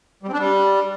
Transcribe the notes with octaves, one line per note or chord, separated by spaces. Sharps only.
G3
C4
D4
G3